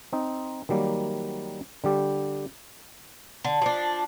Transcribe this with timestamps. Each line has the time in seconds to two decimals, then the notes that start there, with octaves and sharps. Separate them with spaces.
0.12 C4 D#4
0.69 D#3 F#3 G3 A#3
1.84 D3 G3 G4
3.45 D3
3.62 F3 D4